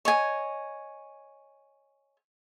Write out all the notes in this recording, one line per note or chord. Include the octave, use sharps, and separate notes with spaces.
C#5 D#5 G#5